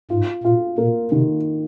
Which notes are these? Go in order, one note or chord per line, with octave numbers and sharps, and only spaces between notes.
G#2 F4
A#2 F4
A#2 A#3
C3 D#3